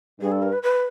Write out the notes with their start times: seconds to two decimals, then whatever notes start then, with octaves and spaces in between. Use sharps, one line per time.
0.20 G2 G#4
0.31 A4
0.42 A#4
0.52 B4
0.62 B4